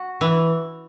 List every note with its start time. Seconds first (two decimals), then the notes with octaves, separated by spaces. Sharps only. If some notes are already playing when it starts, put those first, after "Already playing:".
Already playing: F#4
0.21 E3